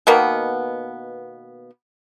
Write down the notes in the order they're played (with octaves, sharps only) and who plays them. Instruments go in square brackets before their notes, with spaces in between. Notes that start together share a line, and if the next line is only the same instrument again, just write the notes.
[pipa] B2 D#3 A#3 B3